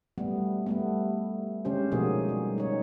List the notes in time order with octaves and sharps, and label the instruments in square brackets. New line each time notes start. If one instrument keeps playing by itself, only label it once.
[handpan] G3 A3 B3
G3 A3 B3
D3 G#3 C#4 G4 C5
B2 F3 A#3 D#4 F#4 G#4
G3
D#4 C#5